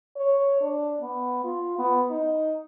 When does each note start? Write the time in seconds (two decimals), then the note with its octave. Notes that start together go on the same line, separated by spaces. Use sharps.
0.16 C#5
0.61 D4
1.01 B3
1.44 F4
1.78 B3
2.10 D#4